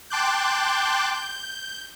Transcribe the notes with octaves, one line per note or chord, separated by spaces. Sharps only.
G5 A5 C6 D6 F#6 G6
G6